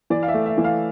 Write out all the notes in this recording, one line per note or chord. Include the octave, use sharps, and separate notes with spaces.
E3 D5
F5
E5
A3
E5
E3
F5